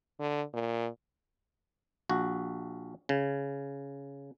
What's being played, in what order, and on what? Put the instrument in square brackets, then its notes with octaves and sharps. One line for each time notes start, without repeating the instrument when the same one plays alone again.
[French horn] D3
A#2
[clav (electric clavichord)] A#1 F#4
C#3